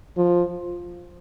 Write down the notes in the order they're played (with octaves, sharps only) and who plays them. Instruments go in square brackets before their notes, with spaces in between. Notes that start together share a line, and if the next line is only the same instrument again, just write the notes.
[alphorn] F3